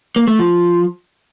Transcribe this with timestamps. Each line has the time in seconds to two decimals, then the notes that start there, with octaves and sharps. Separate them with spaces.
0.16 A#3
0.27 A3
0.39 F3